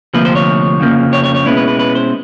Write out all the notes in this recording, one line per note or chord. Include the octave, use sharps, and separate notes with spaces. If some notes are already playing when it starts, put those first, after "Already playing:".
D2 C3 F3 A#3 B4
C5
C#5
F2 C#3 F3 A#3
C#5
C#5
C#5
B2 G#3 C#4 E4 B4
B4
B4
B4
C5